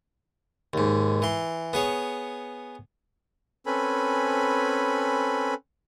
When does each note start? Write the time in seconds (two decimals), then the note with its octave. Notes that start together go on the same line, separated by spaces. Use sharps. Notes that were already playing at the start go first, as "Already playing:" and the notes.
0.73 D#2 G#2
1.22 E3 C6
1.73 B3 G#4 C#5
3.66 C4 C#4 A4 B4 G#5 B5